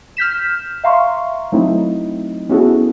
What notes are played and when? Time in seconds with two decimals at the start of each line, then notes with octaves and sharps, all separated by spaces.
0.17 F6 G6 B6 E7
0.84 E5 F5 A#5 C6 C#6
1.52 F#3 A3 C4 D#4 E4
2.49 B3 C#4 E4 F#4 G#4 A4